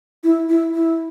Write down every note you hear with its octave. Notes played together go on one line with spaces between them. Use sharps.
E4
E4
E4